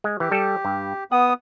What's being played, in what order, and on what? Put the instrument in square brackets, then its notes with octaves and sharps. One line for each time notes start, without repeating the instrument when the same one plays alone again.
[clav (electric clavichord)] G#3
[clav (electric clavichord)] E3 [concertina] G4
[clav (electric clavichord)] G3 A4
G2
[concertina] B3 D#6 [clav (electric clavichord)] F#5